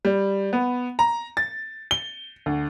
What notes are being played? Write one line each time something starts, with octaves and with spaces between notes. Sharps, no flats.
G3
B3
A#5
A6
G7
D2